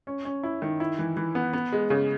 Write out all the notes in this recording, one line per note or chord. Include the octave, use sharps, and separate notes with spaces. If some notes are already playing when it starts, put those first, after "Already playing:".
C#4
C#4
E4
D#3
E4
E3
E3
B3
B3
G#3
C#3